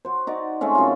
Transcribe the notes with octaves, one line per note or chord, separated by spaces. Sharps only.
F#4 C5
D#4 F#4 D5
G#3 A3 C4 C#4
F#2 F4